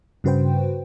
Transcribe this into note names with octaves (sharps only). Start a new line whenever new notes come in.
G2 C#3 F#4 B4 C5 G5